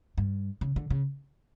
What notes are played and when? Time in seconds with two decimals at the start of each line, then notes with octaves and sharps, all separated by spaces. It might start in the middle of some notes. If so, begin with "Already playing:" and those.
0.18 G2
0.61 C#3
0.76 D3
0.90 C#3